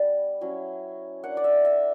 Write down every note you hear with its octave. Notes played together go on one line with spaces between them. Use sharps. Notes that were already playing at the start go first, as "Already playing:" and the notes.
Already playing: G3 B3 D4
F#3 C#4 E4
A#3 D4 F#5
D5
E5
E5